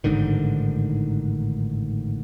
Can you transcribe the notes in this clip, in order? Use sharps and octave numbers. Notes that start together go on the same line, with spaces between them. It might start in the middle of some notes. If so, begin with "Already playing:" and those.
A1 G#2 D3 D#3